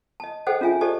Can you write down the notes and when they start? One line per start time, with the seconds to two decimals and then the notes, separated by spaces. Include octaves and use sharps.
0.20 D#5 A5
0.47 G#4 A4 C5 D#5 F#5 G5
0.61 C#4 F4 E5 G#5
0.81 G4 A4 C5 D5 D#5 A5